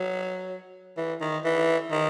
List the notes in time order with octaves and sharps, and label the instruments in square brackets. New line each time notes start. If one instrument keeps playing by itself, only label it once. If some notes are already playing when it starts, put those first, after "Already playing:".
Already playing: [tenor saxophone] F#3
E3
D#3
E3
D#3